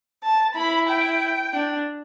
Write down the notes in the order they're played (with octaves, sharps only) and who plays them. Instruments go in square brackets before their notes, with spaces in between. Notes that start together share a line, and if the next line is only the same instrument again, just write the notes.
[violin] A5
[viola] E4 [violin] B5
[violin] G5
[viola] D4